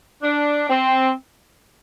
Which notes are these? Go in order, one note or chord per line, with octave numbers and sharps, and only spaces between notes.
D4
C4